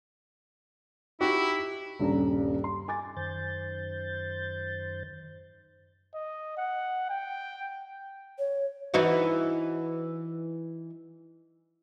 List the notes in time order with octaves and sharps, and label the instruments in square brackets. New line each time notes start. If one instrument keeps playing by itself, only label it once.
[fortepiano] D#4 F#4 G4 [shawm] E4
[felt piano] D#1 G2 C#3 A#5
C6
G#5 D6 A6
[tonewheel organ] F#2 D#3 C5 G6 A6
[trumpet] D#5
F#5
G5
[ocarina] C#5
[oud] E3 D#4 F#4